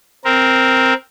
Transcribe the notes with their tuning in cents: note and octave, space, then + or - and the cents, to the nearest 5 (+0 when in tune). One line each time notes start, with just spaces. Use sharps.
C4 +0 A#4 +0